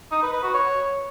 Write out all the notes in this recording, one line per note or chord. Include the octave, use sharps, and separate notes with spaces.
D#4
B4
B4
F#4
C#5